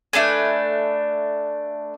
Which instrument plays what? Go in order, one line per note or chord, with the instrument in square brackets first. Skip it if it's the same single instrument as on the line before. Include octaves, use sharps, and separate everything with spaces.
[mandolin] A3 D4 B4 G#5